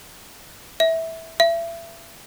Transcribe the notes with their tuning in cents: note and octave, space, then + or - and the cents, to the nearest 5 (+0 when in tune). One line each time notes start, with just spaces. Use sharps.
E5 -15
E5 +30